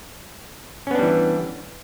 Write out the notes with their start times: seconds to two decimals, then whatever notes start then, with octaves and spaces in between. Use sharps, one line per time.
0.87 C#4
0.91 B3
0.95 D4
0.99 G3
1.03 E3